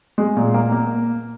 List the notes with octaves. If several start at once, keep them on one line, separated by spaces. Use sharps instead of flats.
G#3
A#2
A#3
A#3